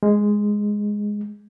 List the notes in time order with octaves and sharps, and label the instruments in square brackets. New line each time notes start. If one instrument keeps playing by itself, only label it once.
[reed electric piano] G#3